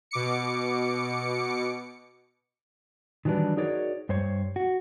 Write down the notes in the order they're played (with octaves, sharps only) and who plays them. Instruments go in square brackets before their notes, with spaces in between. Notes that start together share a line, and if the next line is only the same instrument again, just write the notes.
[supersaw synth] B2 D6 C#7
[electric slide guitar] D#3 E3 F#3 G3 D4 B4
D#4 F#4 G#4 A#4 C#5 D5
G2 C5 C#5
F#4